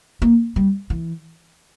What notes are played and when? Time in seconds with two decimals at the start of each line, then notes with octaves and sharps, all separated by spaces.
0.22 A#3
0.56 G3
0.90 E3